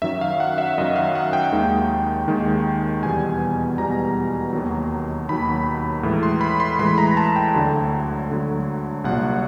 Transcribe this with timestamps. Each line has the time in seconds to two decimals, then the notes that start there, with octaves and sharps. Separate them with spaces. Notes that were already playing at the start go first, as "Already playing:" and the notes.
0.02 F#2 D#3 F#3 E5
0.21 F5
0.40 F#5
0.58 E5
0.78 F#2 D#3 F#3 D#5
0.96 F5
1.15 F#5
1.33 G5
1.52 D#2 D#3 G#3
2.27 D#2 D#3 G#3
3.03 E2 B2 G3 G#5
3.78 E2 B2 G3 A#5
4.53 D#2 D#3 F#3
5.29 D#2 D#3 F#3 B5
6.03 A2 E3 G#3
6.23 C6
6.41 B5
6.60 C6
6.79 A2 E3 G#3 B5
6.98 A#5
7.17 A5
7.36 G5
7.55 D2 D3 F#3
8.30 D2 D3 F#3
9.04 C2 A#2 F#3 F#5